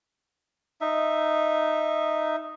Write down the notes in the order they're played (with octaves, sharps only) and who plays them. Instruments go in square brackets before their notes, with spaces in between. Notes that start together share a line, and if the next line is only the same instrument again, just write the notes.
[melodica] D#4 E5